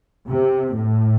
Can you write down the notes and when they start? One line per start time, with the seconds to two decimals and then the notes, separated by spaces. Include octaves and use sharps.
0.29 C3
0.75 A2